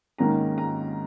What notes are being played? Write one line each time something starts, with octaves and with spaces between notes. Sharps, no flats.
G#2 D#3 A#3 C#4 A#5
A#5